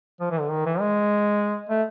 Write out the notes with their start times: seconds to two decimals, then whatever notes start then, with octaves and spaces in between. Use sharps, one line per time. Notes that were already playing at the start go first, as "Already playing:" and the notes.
0.20 F3
0.31 E3
0.40 D3
0.51 D#3
0.66 E3
0.80 G#3
1.69 A3